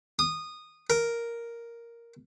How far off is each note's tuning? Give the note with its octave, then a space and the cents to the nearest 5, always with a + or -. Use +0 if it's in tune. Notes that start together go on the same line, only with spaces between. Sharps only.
D#6 -15
A#4 +0